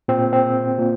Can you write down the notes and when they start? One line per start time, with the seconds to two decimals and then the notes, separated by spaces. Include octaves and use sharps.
0.08 A#2 C4
0.33 C4
0.79 A#2